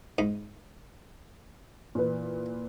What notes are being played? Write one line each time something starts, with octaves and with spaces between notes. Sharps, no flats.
G#2
A#2 E3 B4